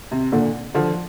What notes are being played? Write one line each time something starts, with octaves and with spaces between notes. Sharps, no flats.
C3
A#2 D3
D3 F3